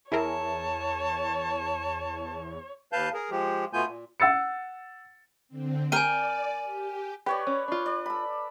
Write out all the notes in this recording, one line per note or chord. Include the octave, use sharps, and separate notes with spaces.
E2 E4 G#4 A#4 C#5 A5
D#2 B4 F5 A5 G6
G#4 A#4
F3 G#3 G4
B2 A3 B3 F4 G#5 G6
A#2
F#5 E6 A6 C#7
D3 C4
A#4 D5 G5 G#5 D#7
G4
G4 B4 C#5 D5
C#4
D4 F4
D5
A4 B5